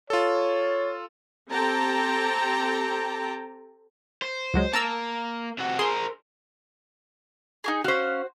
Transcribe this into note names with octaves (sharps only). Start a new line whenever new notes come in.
F4 A4 C#5
C4 G4 A4 G5 A5 A#5
C5
C#2 F#3 G#3
A#3 A5 A#5 E6
C3 F#4
G#4 A#4 C5 C6
D#4 G4 G#4
C#4 F#4 C5 F5